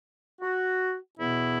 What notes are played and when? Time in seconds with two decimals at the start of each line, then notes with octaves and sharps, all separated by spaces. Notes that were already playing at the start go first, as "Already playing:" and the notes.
0.41 F#4
1.18 E2 B2 B3 E4